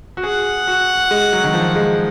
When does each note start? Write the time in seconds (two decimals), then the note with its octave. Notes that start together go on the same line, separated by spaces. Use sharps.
0.17 F#4
0.23 G#4 F#5
0.68 F#4
1.11 G#3
1.33 F#3
1.44 D#3
1.54 F3
1.76 G#3